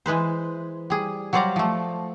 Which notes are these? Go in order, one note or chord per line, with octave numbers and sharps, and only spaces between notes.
E3 G#3 B4 C5
G3 G#4
F#3 G3 C5 D5 F5 A#5
F3 A3